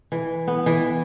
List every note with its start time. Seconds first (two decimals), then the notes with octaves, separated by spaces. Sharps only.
0.12 E3
0.48 B3
0.66 E3